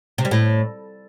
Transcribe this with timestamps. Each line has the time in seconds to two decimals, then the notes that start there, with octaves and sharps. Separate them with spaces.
0.18 C3
0.25 G3
0.31 A2